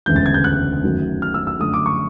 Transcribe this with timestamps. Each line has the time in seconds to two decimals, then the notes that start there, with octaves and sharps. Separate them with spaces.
0.06 E1 D2 C#3 E3 G#3 G6
0.16 A6
0.26 G#6
0.34 G6
0.44 F#6
0.83 F#2 D#3 F#3 A3
1.22 F6
1.34 E6
1.47 E6
1.60 F#2 D3 F3 A3 D#6
1.74 D6
1.86 C#6